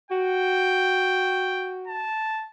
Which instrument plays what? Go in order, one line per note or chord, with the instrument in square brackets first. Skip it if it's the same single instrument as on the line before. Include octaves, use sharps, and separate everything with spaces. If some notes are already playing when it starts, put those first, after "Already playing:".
[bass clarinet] F#4 [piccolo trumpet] G5
[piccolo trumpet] A5